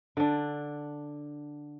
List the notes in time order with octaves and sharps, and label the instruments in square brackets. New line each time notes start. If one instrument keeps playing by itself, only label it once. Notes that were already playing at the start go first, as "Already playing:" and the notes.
[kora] D3 D4